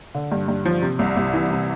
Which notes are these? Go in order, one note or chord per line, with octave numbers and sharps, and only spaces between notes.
D3
G2
G2
F3
C3
C2
C2
E3
C3